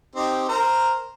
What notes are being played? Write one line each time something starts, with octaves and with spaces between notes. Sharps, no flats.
C4 D#4 G4
A#4 C5 A#5